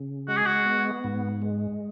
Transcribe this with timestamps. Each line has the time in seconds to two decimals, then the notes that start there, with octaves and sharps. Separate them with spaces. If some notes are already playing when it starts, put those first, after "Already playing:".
Already playing: C#3
0.28 G#3 F#4
0.37 G#4
0.46 F#4
0.65 B3
1.04 G#2
1.42 G#3